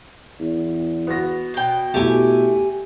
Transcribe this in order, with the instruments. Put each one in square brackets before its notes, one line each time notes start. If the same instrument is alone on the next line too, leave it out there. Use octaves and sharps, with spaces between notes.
[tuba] E2
[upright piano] B3 F#4 A#6
[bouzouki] B2 G5
[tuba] B2 [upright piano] A3 E4 [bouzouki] G4 G#5